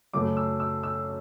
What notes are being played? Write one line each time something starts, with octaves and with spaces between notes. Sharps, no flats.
F#2 C#3 F#3 A3 D6
E6
E6
E6